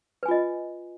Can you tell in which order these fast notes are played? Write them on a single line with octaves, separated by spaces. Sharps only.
B4 G#5 F4 D#5